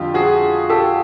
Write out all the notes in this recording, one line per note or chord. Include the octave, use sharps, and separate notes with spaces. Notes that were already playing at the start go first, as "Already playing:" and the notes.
Already playing: F2 D3 G3 F4 G4
F#4 G#4
G4 A4